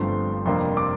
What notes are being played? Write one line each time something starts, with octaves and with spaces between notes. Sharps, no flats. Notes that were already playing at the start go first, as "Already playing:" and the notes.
Already playing: G1 G2 F3 A3 C4 C6
F2 C3 G3 A#3 D4 C6
D6